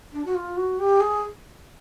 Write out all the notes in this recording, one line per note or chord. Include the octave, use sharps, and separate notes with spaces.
D4
F#4
F4
F#4
G4
G#4